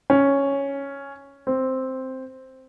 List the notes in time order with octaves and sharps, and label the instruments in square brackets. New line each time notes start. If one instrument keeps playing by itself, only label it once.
[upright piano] C#4
C4